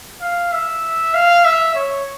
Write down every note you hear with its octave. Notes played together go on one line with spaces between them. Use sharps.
F5
E5
F5
E5
C#5